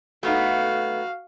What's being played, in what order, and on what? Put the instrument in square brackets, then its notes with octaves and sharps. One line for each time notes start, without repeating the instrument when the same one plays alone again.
[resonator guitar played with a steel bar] A3 B3 D#4 [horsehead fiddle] F#4 F5